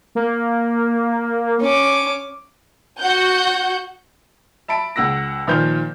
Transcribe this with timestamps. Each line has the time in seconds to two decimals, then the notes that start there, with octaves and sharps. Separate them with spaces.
0.15 A#3
1.62 C#4 D6
3.00 F#4 F#5 G6
4.68 E5 A5 B5 D7
4.96 C#2 F#5 E6 A#6
5.47 A#2 D#3 F3 C5 F6 G6